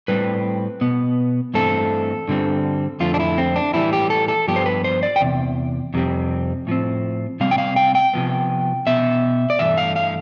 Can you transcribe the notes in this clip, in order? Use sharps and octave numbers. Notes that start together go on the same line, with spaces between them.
A2 G3 C4 B4
B2 B3
G2 E3 A3 C4 A4
G2 D3 G3 C4
F2 D3 F3 A3 F4
D4
E4
C4
D4
A2 E3 G3 E4
G4
A4
A4
G2 F3 B3 G4
C5
B4
C5
D5
G5
E2 C3
F2 C3 G3 C4
A2 F3 C4
C3 G3 C4 F5
G5
F5
G5
G5
C3 F3 B3
B2 B3 E5
D5
G2 E3 A3 E5
F5
F5